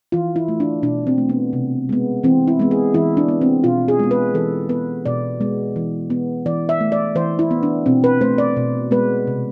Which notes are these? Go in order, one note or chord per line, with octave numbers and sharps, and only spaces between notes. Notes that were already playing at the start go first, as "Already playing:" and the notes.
E3 F4
E4
A3
D4
B2 D4
C4
A3
B3
C3
G#3 B3
E3 C4
E4
G#3 B3
G#4
E3 E4
D4
B3
C4
B2 F4
G#4
G#3 B3
B4
E3 A4
B3 B4
B2 D5
G#3 B3
E3
B3
E3 D5
E5
A3
D5
E3 C5
E4
B3
D4
B2 C4
B4
A3 C5
D5
B2
G#3 B3 B4
C3